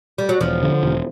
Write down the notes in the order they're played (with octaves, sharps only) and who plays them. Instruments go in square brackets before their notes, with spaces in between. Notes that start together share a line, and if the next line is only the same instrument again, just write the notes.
[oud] G3
F#3
[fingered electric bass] E1 [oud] F3
[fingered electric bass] D3
E1